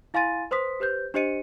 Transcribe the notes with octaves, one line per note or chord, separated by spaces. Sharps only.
E4 F5 G#5 C6 A6 D#7
B4 C5 C6 D#6 B6
G4 B4 C5 G6
D4 G4 C5 D#5 C#7 D#7